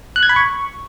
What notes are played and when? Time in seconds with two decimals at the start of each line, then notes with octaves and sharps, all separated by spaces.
0.16 F#6
0.23 G#6
0.29 B5
0.36 C#6